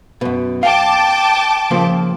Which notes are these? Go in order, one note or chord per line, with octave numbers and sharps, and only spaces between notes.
F#2 B2
F5 G5 A5 D6
C#3 F3 A#3